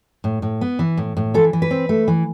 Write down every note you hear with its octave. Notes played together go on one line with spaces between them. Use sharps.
A2
A2
B3
E3
A2
A2
E3 A4
E3
B4
C4
A3
E3